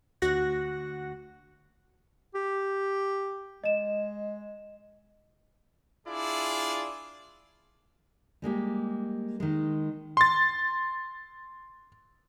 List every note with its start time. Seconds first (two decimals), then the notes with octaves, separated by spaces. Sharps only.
0.22 D2 F#4 F#5 A#6
2.35 G4
3.64 G#3 D#5 E7
6.06 D4 E4 F4 G#4 D5
8.42 G3 G#3 A#3 G4
9.40 D#3 G#3
10.17 C6 A6